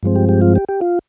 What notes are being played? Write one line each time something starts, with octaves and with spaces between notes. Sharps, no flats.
G2 F3 G#3 C4
G4
G4
F4
G4
G4
F4